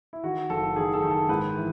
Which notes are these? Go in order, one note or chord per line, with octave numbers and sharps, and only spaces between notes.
E4
D#3 F#4
F#1 A4
D#3 G#4
A4
D#3
A4
G#2 B4
E3